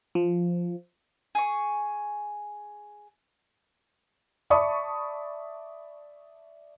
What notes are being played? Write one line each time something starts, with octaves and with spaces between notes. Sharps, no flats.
F3
G#4 C#6
D5 E5 A5 B5 C#6 D#6